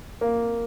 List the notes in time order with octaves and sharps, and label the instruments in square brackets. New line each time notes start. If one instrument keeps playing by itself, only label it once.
[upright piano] A#3